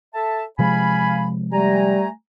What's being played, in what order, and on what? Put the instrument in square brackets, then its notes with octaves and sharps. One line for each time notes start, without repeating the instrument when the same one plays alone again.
[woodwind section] A4 E5 A5
[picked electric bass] C3 F3 G#3 [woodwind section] F5 G#5 B5
[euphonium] G3 [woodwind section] A3 G#5 A#5